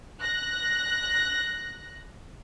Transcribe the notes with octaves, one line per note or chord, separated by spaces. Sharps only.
F#6 A#6